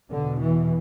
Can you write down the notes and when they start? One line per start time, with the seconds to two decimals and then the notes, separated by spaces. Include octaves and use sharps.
0.11 E2 B2 D3
0.41 E3